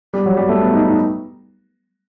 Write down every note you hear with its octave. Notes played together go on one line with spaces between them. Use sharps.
G3
F#3
G3
A3
B3
D#4
D#4